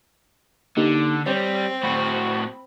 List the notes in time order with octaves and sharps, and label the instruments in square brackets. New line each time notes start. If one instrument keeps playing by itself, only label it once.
[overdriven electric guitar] D3 [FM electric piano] A#3 D#4 G4
[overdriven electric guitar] G3 [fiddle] C4 [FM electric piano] C#5
[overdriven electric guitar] A2 F#4 [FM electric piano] B5